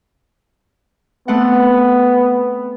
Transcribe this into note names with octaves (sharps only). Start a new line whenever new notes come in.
A3 B3 C4 F#5